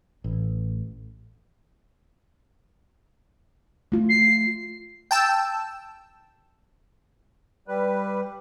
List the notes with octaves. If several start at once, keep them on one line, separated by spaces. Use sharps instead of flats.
A1
A3 F4
C7
G5 A5 E6
G3 B4